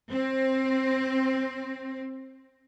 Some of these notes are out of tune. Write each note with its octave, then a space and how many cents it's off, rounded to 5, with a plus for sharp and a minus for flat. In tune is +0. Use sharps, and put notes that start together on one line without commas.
C4 +15